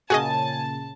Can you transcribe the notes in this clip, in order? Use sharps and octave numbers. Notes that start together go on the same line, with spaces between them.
A#2 C#3 F#4 G#4 D#5 G#5 A5